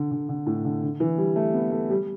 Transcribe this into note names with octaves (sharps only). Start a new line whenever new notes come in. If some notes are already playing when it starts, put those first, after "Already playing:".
Already playing: D3
D3
D3
A2
D3
D3
E3
G3
A3
B3
A3
G3